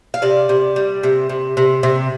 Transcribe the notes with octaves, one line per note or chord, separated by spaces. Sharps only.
F5
C3 D5
C3
G3
C3
C3
C3
C3